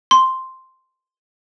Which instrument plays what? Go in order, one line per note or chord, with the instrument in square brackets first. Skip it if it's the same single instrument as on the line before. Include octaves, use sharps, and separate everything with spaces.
[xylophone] C6